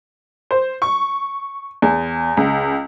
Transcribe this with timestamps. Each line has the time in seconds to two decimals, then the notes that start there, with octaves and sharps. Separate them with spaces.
0.51 C5
0.82 C#6
1.82 E2
2.37 C#2